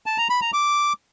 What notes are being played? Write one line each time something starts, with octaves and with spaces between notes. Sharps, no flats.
A5
A#5
B5
A#5
D6